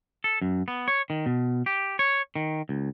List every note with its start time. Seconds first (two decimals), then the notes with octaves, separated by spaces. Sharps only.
0.24 A4
0.42 F#2
0.68 B3
0.88 C#5
1.10 D#3
1.26 B2
1.66 G4
1.99 C#5
2.36 D#3
2.69 C#2